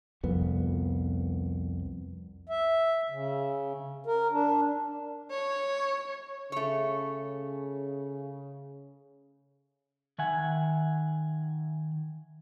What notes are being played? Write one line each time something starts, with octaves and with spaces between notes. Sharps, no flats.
C2 F2 B3
E5
C#3
A#4
D4
C#5
C#3 A3 C#5
D#3 E5 F#5 G#5